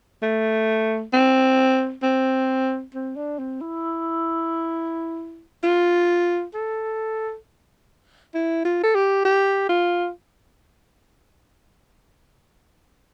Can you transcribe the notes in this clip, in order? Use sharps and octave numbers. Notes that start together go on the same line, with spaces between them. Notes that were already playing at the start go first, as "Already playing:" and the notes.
A3
C4
C4
C4
D4
C4
E4
F4
A4
E4
F4
A4
G4
G4
F4